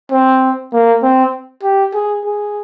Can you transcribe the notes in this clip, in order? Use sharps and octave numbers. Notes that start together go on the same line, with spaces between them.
C4
A#3
C4
G4
G#4
G#4